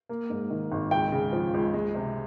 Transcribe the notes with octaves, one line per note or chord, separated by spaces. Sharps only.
A#3
G#2
D#3
G#1
C#2 G5
C#3
F3
C#2
G#3
C3